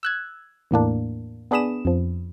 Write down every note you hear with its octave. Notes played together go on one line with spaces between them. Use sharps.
E6 F#6 G#6
E2 A2 A#3 D4
B3 D4 G#4 B5 D#6 E7
F2 F3